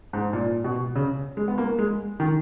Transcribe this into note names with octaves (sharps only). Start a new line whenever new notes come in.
G#2
A#2
B2
C#3
G#3
B3
A#3
G#3
D#3